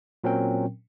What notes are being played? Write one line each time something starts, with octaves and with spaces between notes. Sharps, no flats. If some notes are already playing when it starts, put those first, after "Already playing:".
A#2 F#3 C4 C#4 A#4 G5